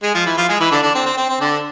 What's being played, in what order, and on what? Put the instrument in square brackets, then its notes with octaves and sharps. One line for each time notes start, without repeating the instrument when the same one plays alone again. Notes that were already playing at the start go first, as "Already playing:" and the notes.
[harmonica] G#3 G#4
F3 F4
E3 E4
F3 F4
G#3 G#4
E3 E4
D3 D4
D3 D4
C4
C4
C4
C4
D3 D4